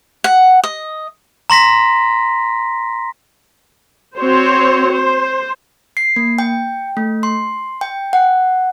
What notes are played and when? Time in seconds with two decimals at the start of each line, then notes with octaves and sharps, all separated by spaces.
0.24 F#5
0.64 D#5
1.50 A#5 C6 A#6 B6
4.19 C4 F#4 C5 C#5
4.93 C5
5.97 C7
6.16 A#3
6.39 G5
6.97 A3
7.23 C6
7.81 G5
8.13 F#5